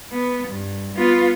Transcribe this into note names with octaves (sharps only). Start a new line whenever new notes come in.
B3
G2
B3 F4